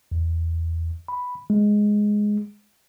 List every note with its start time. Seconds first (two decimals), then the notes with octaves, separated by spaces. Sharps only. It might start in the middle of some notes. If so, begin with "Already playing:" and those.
0.12 E2
1.08 B5
1.50 G#3